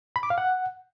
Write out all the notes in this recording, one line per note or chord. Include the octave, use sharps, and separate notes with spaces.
B5
D6
F5
F#5